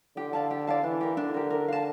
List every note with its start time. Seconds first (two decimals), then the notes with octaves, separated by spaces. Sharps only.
0.17 D3 G4
0.33 D5 F5 A5
0.51 G4
0.67 D5 F5 A5
0.83 E3 D4
1.01 G4 A#4
1.17 D3 D4
1.34 G4 A#4
1.50 A#4
1.68 F5 A5